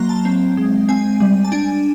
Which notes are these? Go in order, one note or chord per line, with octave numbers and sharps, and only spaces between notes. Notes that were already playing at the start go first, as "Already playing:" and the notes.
Already playing: F#3 A#3 A#5 C6
A5
C4
G#3
C4 G#5
G3
A5
D4 G#5